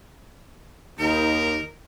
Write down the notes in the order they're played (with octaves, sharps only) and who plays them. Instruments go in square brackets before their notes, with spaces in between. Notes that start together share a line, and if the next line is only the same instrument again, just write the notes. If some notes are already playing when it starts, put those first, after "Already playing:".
[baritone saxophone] D#2 [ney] D#4 [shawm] A#4